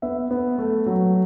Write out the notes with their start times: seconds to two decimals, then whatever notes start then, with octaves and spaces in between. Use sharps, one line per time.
0.02 B3 E5
0.31 B3
0.58 A3
0.86 F#3